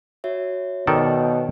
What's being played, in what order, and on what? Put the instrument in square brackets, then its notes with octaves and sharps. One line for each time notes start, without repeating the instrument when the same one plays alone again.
[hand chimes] F#4 C#5 E5
[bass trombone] B2 [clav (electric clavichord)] D#3 A4 D5